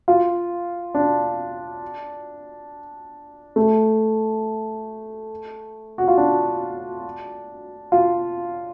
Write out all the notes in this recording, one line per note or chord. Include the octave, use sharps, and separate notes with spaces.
F4
D4
A3
F#4
F4
D4
F4